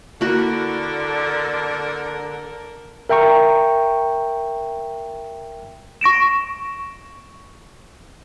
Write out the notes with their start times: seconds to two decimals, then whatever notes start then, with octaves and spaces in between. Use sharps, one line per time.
0.21 D3 A#3 E4 F#4 A4 A#4
3.09 A#4 E5 G5 A#5 C#6
6.01 C#6 A#6 D7 E7